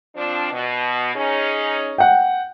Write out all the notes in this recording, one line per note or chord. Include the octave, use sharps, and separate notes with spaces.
F3 C4 D4
B2
C#4 D#4 G#4
F#5 G5